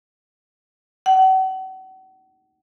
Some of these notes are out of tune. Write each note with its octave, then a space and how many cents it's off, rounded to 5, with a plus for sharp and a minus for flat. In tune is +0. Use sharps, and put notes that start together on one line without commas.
F#5 +40